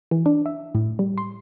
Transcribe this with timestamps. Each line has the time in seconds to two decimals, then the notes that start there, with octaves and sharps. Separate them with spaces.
0.11 E3
0.26 D4
0.46 E5
0.75 A2
0.99 G3
1.18 C6